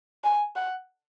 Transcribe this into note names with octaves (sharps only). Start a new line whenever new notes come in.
G#5
F#5